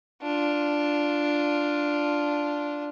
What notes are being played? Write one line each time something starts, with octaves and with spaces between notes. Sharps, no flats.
D4 F4